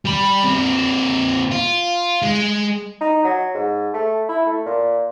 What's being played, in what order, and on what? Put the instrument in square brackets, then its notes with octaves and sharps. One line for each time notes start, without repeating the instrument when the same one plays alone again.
[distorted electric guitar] G3 B5
A#2 C4
F4
G#3
[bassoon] D#4
F#3
G#2
A3
E4
A3
A#2